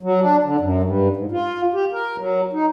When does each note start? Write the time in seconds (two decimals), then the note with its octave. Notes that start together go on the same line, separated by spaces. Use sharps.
0.03 F#3
0.21 D4
0.43 D3
0.60 F#2
0.83 G2
1.16 G#2
1.32 F4
1.74 G4
1.92 A#4
2.18 F#3
2.53 D#4